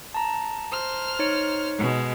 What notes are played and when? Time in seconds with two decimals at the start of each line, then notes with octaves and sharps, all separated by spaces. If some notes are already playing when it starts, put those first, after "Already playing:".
0.14 A5 A#5
0.71 C5 F6
1.19 D#4 C#5 C#7
1.77 B2 G#3